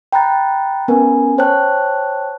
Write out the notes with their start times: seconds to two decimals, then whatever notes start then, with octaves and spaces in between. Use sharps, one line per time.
0.12 G5 A#5 B5 F#6 A6
0.88 B3 C#4 A#4 B4 G#5
1.38 C5 C#5 G5 A5 F#6